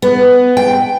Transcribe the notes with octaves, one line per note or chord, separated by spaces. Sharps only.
B3
G5